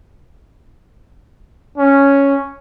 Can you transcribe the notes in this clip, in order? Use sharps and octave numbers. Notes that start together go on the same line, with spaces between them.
C#4